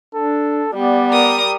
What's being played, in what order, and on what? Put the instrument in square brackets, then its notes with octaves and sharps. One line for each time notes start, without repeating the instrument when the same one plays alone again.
[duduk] D4 [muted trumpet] A4
[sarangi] G3 [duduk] B3 [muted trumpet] D5
[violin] A#4 D#6